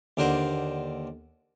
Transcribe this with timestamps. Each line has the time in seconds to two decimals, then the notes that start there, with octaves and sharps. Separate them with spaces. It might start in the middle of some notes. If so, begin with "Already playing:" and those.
0.17 D#2 D3 A#4 C5 F#5